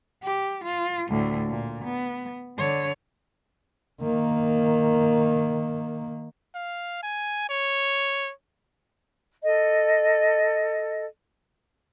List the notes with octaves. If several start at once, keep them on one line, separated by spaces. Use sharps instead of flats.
G4
F4
D2 A2
A#2
B3
D3 C#5
D#3 A#3
F5
G#5
C#5
A4 D#5